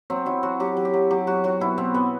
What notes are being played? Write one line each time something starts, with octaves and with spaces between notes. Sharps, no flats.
F#3 C4
F#3 E4
F#3 F#4
F#3 G4
F#3
G4
F#3
F#3 G4
F#3 F#4
F#3 F#4
B2 E4
B2 C4
B2 B3